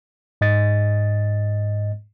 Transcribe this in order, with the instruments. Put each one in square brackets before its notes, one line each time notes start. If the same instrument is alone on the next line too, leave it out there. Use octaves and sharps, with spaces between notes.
[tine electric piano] G#2 D#5 A6